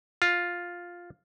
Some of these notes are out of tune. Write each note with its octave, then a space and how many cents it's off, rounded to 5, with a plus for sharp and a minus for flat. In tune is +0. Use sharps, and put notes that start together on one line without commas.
F4 +5